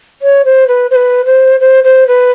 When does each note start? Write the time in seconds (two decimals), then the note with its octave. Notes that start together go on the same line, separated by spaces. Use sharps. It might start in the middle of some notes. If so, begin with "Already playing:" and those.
0.22 C#5
0.44 C5
0.67 B4
0.90 C5
0.95 B4
1.25 C5
1.60 C5
1.83 C5
2.07 B4